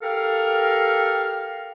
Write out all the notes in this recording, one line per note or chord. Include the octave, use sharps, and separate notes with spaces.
G4 A4 A#4 F5